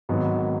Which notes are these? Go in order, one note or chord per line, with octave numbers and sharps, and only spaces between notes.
G#1 G#2 D#3 F#3 B3